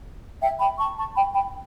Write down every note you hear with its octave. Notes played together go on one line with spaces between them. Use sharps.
E5 G5
G5 B5
A5 C#6
A5 C#6
G5 B5
G5 B5